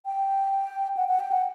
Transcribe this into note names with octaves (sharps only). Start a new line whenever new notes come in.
G5
F#5
F#5
G5
F#5